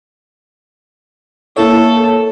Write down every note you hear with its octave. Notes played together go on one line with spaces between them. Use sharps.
A#3 E4 A4 C#5